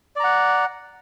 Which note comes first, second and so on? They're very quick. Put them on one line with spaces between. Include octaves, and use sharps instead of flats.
D5 A#5 F#5